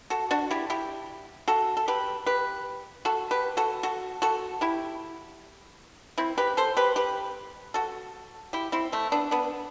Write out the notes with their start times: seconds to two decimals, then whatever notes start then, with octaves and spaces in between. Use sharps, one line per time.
0.10 F#4 A4
0.31 D4 F#4
0.51 E4 G4
0.70 E4 G4
1.48 F#4 A4
1.77 A4
1.88 G4 B4
2.26 G4 B4
3.05 F#4 A4
3.31 G4 B4
3.57 F#4 A4
3.83 F#4 A4
4.22 F#4 A4
4.61 E4 G4
6.18 C4 E4
6.38 G4 B4
6.57 A4 C5
6.77 G4 B4
6.96 G4 B4
7.74 F#4 A4
8.53 E4 G4
8.72 C4 E4
8.92 A3 C4
9.12 B3 D4
9.31 B3 D4